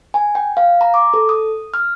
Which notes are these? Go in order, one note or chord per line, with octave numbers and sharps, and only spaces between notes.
G#5
G5
F5
A#5
D6
A4
D#6
F6